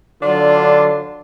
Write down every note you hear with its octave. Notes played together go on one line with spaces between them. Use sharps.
D3 F#3 D4 F4